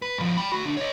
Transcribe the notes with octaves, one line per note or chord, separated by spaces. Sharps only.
B4
G2 F3
G5 B5
A3 F#4
D2 D4
C#5 D#5